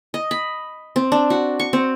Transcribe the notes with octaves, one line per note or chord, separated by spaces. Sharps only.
D#5
B5
C4
D4
F#4
C#6
C4